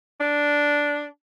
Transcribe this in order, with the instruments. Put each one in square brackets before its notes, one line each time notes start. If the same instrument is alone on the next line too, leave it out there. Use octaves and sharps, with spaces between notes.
[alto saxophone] D4